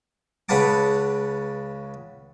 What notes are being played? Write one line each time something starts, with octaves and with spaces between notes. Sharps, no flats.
C#2 C#3 B4 F#5 A5 D6